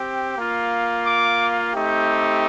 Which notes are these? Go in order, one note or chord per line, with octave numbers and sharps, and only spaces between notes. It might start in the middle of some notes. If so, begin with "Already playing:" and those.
Already playing: C4 G4
A#3 F4
D6
A3 C4 D#4 G4